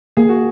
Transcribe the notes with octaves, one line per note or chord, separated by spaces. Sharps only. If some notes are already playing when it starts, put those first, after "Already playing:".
A#3 G#4
F#4